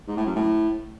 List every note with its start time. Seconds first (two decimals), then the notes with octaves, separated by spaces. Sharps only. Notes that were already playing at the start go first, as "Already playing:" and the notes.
0.08 G#2
0.17 A2
0.26 F#2
0.36 A2